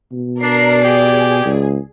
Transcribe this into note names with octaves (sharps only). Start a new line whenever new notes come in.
B2
D4 A#4 D5 C7
G4 G#4
C#2